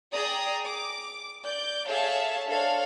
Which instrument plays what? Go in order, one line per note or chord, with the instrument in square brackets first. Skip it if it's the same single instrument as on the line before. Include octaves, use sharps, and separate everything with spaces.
[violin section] G#4 D5 G5 A#5 D#6
D6
D5 D6 G6
G#4 A4 C#5 E5 F5 A5
D4 A4 C5 C#5 F5